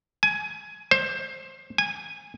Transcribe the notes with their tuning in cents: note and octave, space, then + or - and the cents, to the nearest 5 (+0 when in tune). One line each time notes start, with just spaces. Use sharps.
G#5 +15
C5 +20
G#5 -15